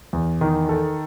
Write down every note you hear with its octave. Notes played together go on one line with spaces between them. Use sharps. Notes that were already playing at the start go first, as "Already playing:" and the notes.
E2
D#3
A4